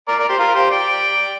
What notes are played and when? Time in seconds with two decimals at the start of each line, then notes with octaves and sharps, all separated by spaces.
0.08 A#4 D5
0.19 A#4 D5
0.29 G4 C5
0.39 F4 A#4
0.54 G4 C5
0.70 D5 G5